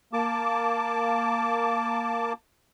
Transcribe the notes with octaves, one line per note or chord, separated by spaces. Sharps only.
A#3 A5 D6